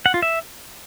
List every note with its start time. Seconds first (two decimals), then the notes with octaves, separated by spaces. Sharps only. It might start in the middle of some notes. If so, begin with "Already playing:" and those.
0.06 F#5
0.14 F4
0.22 E5